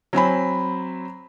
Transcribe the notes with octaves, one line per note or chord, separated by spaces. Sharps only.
F#3 C4 G#5 B5